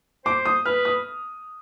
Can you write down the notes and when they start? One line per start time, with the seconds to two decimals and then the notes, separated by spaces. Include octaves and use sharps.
0.26 C5 D6
0.46 D#6
0.66 B4 F6
0.85 D#6